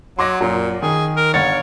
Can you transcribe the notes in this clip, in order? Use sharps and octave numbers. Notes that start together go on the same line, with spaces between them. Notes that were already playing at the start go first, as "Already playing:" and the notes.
F#3 C6 D6 A#6
F#2 A#2
D#3 G#4
A#4
G1 C#5 F#5 A6